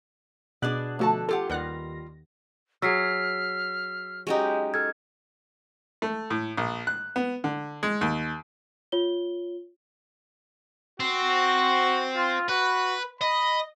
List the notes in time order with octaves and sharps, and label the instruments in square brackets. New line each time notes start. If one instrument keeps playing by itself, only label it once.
[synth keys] B2 F#6 [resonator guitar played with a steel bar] D4 G#4 D5
[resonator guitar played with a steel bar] D3 A4 A5 [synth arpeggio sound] F3 A3 F#4
[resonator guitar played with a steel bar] F4 G4 F#5 [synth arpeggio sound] A4
[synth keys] D#2 A#6 [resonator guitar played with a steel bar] G3 F4 [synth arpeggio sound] B4 F#5 F#6
[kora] F#3 G#4 [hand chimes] E6 B6 C7 [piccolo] F6
[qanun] G#3 C#4 G4 [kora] D#4 F#4
[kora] A4 [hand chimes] F6 G#6
[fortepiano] A3
A2
A#1
F#6
B3
D3
G#3
D#2
[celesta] F4 C#5 G7
[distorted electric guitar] C4 [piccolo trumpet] F#4
[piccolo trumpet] F4
[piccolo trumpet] F#4 [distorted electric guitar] B4
[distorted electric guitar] D#5 [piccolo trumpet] B5